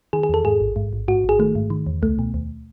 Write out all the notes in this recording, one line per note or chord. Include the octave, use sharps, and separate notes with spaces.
D#3 G#4
G#4
E2 A4
G#2 G#4
A1
G#2
A1
G#2 F#4
A1 G#4
D#3 A3
G#2
D#3
E2
C#2 A3
B2
D#2